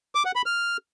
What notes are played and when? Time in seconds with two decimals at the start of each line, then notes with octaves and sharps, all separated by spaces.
0.15 D6
0.25 F#5
0.36 B5
0.46 F6